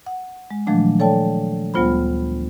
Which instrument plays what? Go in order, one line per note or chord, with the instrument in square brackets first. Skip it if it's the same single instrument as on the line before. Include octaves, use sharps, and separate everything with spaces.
[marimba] F#5
G#3
A#2 D#3 F3 F#3 A3 D4
A4 C#5 D5 G5 A5
D2 G3 B3 F4 C5 B5